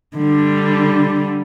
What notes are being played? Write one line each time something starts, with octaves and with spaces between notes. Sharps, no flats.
D3 G3